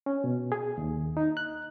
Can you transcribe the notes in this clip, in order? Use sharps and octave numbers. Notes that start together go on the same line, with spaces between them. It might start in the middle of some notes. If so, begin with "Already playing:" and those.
C#4
B2
G#4
D#2
D#4
F#6